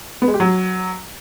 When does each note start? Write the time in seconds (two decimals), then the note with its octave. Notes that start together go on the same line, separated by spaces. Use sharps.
0.22 B3
0.28 G#3
0.34 G4
0.40 F#3